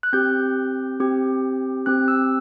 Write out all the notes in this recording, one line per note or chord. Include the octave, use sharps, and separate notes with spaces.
F#6
C4 G4 G6
C4 G4
C4 G4 F#6
E6